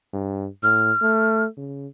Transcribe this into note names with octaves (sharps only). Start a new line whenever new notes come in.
G2
A2 F6
A3
C#3